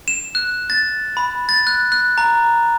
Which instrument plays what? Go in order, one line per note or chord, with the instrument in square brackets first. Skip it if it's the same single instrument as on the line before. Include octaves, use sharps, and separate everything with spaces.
[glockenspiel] E7
F#6
A6
B5
A6
F#6
F#6
A#5